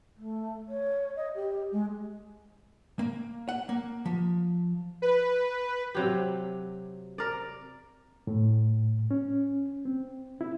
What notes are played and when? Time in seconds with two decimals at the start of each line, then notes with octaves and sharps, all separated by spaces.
0.17 A3
0.68 C#5
1.16 D#5
1.35 G4
1.72 G#3
2.99 A#3
3.49 F#5
3.69 A#3
4.05 F3
5.02 B4
5.95 C3 F#3 G4
7.18 A#4 D5
8.27 A2
9.11 C#4
9.85 C4
10.41 E4